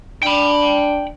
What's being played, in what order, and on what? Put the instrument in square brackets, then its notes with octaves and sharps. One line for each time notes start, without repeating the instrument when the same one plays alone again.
[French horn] D4 [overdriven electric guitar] G5 B5